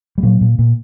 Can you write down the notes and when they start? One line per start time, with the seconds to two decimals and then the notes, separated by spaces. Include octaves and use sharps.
0.18 G3
0.23 A#2 F#3
0.41 A#2
0.59 A#2